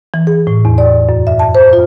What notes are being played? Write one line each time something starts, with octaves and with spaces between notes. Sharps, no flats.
E3
G#4
A2
E2
D5
F#2
E5
A5
C5
F4